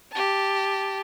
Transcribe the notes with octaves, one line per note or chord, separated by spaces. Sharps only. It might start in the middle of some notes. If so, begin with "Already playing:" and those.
G4 A5